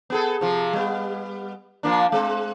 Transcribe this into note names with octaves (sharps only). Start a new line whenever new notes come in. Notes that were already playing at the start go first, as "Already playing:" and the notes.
B3 G#4 A4
C3 F3
G3 B3
F3 A#3 D4
G#3 C4